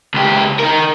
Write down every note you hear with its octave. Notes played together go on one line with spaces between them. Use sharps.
C#2 G4
D#4 A#4